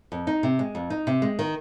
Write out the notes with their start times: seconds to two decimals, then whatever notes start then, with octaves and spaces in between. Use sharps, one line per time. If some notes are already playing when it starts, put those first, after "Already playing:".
0.12 F2
0.27 D#4
0.43 C3
0.59 G#3
0.75 F2
0.90 D#4
1.07 C3
1.22 G#3
1.39 D#3